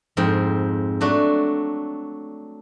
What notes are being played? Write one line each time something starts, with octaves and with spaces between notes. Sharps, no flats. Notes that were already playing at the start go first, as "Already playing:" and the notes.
F2 G#2 C4 G#4 G5
F#3 A3 D4 F#4